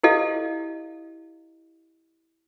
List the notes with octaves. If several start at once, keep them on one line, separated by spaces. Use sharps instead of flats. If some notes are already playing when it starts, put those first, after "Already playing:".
E4 G4 A4 D#5 F5